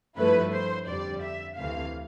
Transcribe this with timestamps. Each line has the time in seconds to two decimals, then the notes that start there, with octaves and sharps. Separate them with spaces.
0.18 G2 F3 A3 E4 B4
0.53 C5
0.88 F2 D3 G3 D5
1.23 E5
1.57 D2 C3 E3 A3 F5